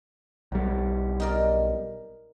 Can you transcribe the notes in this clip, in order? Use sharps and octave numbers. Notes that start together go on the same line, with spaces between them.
B1 G3
D#4 A#4 D5